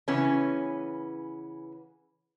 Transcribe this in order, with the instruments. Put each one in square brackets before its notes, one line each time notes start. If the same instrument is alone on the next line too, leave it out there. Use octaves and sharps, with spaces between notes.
[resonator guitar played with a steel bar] C#3 E3 B3 C#4